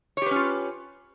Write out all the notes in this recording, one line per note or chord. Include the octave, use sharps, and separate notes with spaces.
C#4 F4 G4 B4 C#5